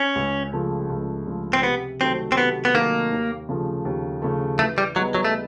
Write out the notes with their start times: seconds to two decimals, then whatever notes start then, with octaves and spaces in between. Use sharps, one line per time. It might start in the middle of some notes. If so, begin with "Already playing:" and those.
Already playing: C#4
0.15 C#2
0.53 C#3 F3 A3
0.90 C#2
1.27 C#3 F3 A3
1.53 C4
1.63 C3 B3
2.00 D#3 F#3 A3 C4
2.32 C4
2.37 C3 B3
2.65 B3
2.75 D#3 F#3 A3 A#3
3.11 D#2
3.49 C#3 F3 A3
3.85 D#2
4.22 C#3 F3 A3
4.59 E3 A3
4.78 G3
4.96 F#3 G3 B3 D#4 G#4
5.15 F#3
5.25 A3